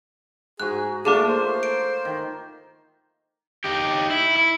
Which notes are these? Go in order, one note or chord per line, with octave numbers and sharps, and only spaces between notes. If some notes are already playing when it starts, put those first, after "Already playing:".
G#2 F#4 G#4 F#6
A3 A#3 D4 F4 G#4 A4 D6
C5
D7
D#3
D#4 G4
E4
E4